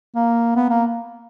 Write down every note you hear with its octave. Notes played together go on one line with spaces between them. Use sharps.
A#3
B3
A#3